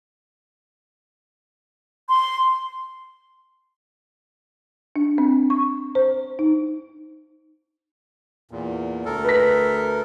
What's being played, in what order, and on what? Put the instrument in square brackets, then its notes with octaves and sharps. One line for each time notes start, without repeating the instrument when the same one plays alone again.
[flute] C6
[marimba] D4
C4
C#6
C5
D#4
[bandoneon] E2 A#2
D2 A4 A#4
[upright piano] B4 B6